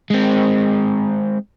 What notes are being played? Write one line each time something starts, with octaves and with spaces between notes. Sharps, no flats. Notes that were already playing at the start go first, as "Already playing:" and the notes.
G#3 C4